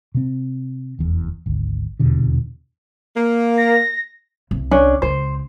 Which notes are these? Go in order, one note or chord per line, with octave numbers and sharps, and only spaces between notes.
C3 C4
F1 E2
G#1 D2
D#1 E2 B2 D3
A#3
A#6
C2
C#4 D4
C#2 C5